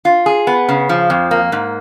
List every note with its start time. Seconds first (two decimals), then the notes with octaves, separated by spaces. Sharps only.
0.05 F4
0.26 G#4
0.47 B3
0.69 C#3
0.89 F3
1.10 F2
1.31 A#3
1.52 G#2